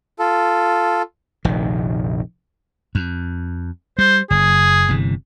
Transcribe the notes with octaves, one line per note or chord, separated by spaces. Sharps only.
F4 A4
F1 A#1 D#3
F2
G3 C5
F#1 G#4
G1 C3 E3